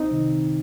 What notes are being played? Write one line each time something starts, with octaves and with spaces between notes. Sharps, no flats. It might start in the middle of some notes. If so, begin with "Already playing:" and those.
Already playing: C2 C4 D#4
C3 D#3